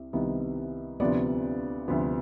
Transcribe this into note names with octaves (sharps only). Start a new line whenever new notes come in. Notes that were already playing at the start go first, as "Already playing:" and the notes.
Already playing: C2 C3
C2 C3 D#3 B3
D2 C3 F3 B3 D5
D2 C3 F3 B3